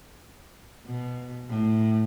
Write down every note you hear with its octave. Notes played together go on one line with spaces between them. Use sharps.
B2
A2